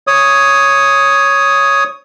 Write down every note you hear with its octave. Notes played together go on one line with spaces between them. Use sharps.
C#5 D#6